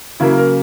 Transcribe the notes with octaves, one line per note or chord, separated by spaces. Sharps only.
C#3 F#3 A#3 E4
A#4